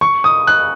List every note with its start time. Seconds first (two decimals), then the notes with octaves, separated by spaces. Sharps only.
0.01 C#6
0.24 D#6
0.47 F#6